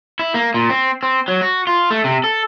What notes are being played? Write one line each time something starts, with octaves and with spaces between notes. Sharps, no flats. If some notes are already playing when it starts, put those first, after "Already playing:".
E4
A#3
A#2
C4
C4
F#3
F#4
F4
A3
C3
A4